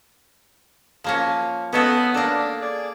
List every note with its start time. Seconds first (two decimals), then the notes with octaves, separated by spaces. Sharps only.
1.04 F3 A#3 C#4
1.73 B3 C#4 D#4 A4
2.14 A#3 D4 A4
2.60 G#4 D5